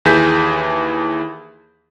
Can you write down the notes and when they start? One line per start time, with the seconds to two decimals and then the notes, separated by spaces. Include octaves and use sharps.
0.05 D#2 E3 G#4 G6 B6